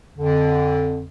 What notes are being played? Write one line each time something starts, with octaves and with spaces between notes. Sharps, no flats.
F2 D3